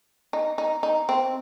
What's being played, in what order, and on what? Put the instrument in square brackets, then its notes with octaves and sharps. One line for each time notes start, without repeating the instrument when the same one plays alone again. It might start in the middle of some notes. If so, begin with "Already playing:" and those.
[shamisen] D#4
D#4
D#4
C4